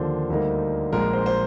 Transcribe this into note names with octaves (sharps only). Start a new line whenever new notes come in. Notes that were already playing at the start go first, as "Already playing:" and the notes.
Already playing: D#2 D3 F3 A#3 D4 C5
D2 D3 G3 A#3 D#4
A#1 A#2 G#3 A#4
C5
C5